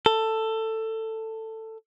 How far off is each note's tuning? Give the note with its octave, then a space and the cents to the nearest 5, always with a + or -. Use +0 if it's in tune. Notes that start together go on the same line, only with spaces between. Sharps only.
A4 +15